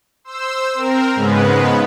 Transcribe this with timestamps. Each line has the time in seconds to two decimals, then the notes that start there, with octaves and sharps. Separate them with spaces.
0.24 C5 E6
0.74 C4 A#4
1.15 G#2 C#3 G#3 B3 B4